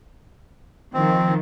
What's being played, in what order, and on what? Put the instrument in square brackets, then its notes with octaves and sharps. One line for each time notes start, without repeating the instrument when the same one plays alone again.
[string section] D#3 F3 [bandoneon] C4